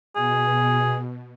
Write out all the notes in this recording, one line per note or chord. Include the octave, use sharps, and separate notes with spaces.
B2 G#4